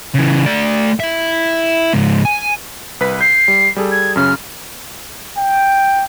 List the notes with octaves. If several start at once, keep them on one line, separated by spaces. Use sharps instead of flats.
C#3 E3
A3 D5
E4 E5
C#2 G#2
G#5
C2 B4 B6
G6 C7
G3
G3 G#4 A4
G#6
F#2 C#3 C#4 F6
G5